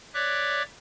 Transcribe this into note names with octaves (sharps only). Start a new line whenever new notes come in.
C#5 D5 E5 D6 F#6